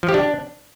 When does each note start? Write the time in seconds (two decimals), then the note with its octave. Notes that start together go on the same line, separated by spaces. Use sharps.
0.03 F3
0.09 G4
0.14 D4